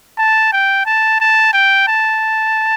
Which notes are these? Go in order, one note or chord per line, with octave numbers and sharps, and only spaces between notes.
A5
G5
A5
A5
G5
A5